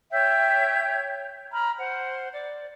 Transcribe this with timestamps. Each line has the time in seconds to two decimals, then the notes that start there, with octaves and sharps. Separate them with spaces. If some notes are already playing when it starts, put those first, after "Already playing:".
0.12 C#5 E5 G5 G6
1.52 A#5 B5 F6
1.79 C5 F#5
2.33 D5